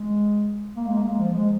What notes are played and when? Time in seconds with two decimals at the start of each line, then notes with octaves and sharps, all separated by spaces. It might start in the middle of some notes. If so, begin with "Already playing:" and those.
Already playing: G#3
0.76 A#3
0.87 G#3
0.97 A#3
1.08 G#3
1.19 F3
1.33 G#3